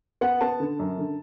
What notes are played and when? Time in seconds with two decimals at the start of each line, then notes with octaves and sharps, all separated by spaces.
0.21 B3 F#5
0.41 B3 A5
0.60 D3
0.79 F#2
0.98 D3